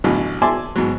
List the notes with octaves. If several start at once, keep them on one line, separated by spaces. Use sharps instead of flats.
A1 B2 D3 F#3
D5 E5 G#5 A5 C6 D6
G#2 B2 F#3